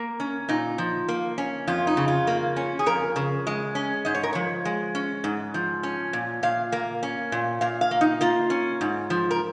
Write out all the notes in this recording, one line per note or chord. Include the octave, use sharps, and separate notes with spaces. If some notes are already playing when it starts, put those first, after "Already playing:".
Already playing: A#3 A#4
C#4
A#2 D#4
F3
A#3
C#4
F2 F4
D#4
C#3
F4
A#3
C#4
G#4
F2 A#4
C#3
G#3
C#4
G#2 D#5
C#5
A#4
F3 C#5
G#3
C#4
G#2
F3
C#4
A#2
A#2 F5
A#3
C#4
A#2
A#2 F5
F5
A#3
D#4
A#3 F4
C#4
G#2
F3
A#4